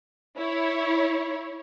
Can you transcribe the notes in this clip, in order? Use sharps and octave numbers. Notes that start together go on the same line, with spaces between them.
E4 C#5